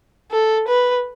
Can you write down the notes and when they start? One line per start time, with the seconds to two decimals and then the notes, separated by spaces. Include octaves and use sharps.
0.31 A4
0.68 B4